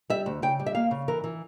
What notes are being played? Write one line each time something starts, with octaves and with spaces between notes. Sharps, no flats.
G3 E5
D2
C#3 G5
G3
E5
A#3 F5
C#3
E3 A#4
E3